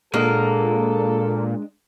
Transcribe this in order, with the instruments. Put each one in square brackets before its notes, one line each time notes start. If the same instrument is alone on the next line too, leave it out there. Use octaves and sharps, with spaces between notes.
[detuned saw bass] A#2 [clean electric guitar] G#3 D4 D#5 [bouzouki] A#3 [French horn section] A4